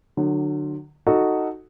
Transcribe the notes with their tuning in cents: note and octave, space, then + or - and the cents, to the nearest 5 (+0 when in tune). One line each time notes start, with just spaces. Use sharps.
D3 +30 F#3 +0
D#4 +0 F#4 +0 A4 +10